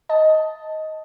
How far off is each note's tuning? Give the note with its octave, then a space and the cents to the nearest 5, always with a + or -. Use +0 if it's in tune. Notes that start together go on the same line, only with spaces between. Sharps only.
D#5 +10 A5 +0